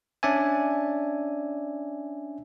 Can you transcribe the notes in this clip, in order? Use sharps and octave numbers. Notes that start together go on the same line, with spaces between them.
C#4 D4 D5 E5 G#5